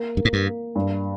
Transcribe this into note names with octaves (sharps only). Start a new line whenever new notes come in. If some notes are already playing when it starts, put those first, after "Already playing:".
Already playing: A#3
G2 A#3
G#2
G2
A#3
G2